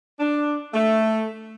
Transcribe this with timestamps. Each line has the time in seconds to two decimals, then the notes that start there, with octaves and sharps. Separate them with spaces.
0.20 D4
0.74 A3